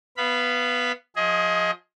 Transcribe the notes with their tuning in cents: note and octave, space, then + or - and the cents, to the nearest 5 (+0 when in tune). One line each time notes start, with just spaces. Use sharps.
B3 +0 F5 -25 B5 +0
F3 +25 G#4 +0 D#5 +25